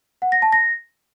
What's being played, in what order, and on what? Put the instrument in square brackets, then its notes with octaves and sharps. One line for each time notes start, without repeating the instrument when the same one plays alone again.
[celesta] F#5
A#6
A5
A#6